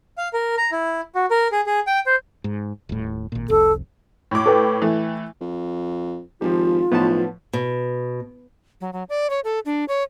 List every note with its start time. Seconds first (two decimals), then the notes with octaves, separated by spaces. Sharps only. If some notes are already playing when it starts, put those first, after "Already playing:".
0.18 F5
0.33 A#4
0.57 A#5
0.72 E4
1.15 F#4
1.31 A#4
1.52 G#4
1.66 G#4
1.87 G5
2.06 C5
2.44 G#2
2.89 D#1 A2
3.32 G#1 A#2
3.50 F1 C2 A4
4.31 A2 D6
4.46 A4 B4 G5
4.82 E3 A3
5.41 F2
6.41 G#1 F3 F4 G4
6.92 B1 A2 F3 B3 A5
7.53 B2
8.81 F#3
8.93 F#3
9.09 D5
9.30 C#5
9.44 A4
9.65 D4
9.88 C#5